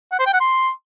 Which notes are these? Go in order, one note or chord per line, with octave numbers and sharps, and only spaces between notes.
F#5
C5
G5
F#5
C6